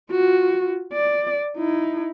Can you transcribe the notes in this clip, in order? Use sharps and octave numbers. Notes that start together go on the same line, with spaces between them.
F4 F#4
D5
D#4 E4